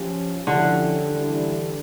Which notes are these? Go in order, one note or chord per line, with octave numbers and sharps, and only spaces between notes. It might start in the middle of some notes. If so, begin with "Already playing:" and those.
Already playing: F3 C#4 G4
D3 F3 C#4 E4 G4
E3 G3 D4